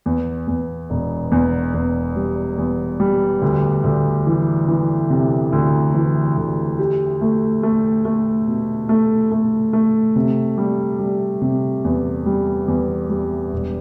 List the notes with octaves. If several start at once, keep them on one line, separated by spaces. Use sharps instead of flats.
E2
E2
E1
E2
E2
G3
E2
G3
D2
D2
E3
E3
C3
D2
E3
D2
G4
A3
A3
A3
B2
A3
A3
A3
C3
G3
G3
C3
E2
G3
E2
G3
E1